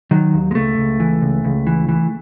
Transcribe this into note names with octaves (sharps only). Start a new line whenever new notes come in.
D#3 F#3
D#2
G#3
C#2 A3
C#2
E3
C#2
C#2
E3
E3